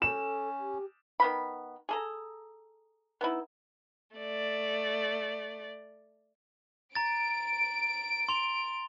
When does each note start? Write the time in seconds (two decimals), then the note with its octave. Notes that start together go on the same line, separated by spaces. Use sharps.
0.02 C#4 A4 E7
0.59 G4
1.20 D#3 B3 B5
1.89 G#4 A4 A#5
3.21 B3 D#4 E4
4.17 A3 D5
6.95 A#5 A6 D7
8.29 C6 F7 G7